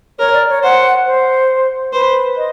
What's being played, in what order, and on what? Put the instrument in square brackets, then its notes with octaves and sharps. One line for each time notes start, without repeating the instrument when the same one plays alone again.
[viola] A#4 [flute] C#5
[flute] D5
C#5
[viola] C5 [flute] F#5
[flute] C5
[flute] B4 [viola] C5
[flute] D#5